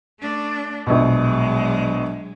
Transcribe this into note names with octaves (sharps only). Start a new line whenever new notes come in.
A3 D4
A#1 B2 F#3 G#3